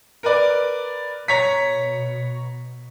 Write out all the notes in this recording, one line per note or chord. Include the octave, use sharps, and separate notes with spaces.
A#4 B4 D5
B2 C#5 A#5 B6